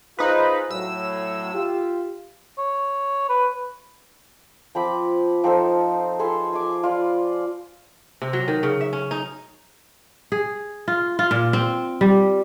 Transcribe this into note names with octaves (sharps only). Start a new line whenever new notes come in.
D#4 F4 G#4 B4 C5
A2 F#3 E6
F4 G4
C#5
B4
F3 C4 B5 D6
F3 C4 D#4 A4
G#4 A4 B4 C6
G#5 D6
F4 D5
C3
F#3
D#3
C#3
E5
C#4
D#4
G#4
F4
F4
A#2
C4
G3